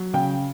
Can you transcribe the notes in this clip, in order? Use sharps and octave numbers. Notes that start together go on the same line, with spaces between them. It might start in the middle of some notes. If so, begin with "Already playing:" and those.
Already playing: F#3
C#3 G5